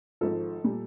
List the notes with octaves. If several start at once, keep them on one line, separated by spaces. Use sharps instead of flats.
G#1 G#2 F3 A4
A#2 G3